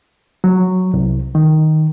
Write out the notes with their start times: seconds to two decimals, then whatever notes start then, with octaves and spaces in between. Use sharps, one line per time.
0.44 F#3
0.94 C2
1.35 D#3